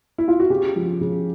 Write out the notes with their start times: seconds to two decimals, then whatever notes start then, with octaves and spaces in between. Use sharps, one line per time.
0.18 E4
0.28 F4
0.40 F#4
0.50 C#3 G4
0.76 F3
1.01 C#3